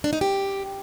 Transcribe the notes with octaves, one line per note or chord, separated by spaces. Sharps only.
D4
D#4
G4